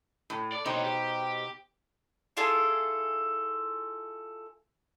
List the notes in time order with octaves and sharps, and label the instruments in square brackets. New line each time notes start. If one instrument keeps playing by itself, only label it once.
[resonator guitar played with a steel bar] A2
[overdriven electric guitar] D5
[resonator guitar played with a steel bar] B2 D#4 C5 [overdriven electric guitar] G4 C#5
[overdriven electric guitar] G4
[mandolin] E4 F4 G#4 A4